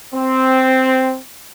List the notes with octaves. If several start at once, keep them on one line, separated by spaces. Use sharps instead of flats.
C4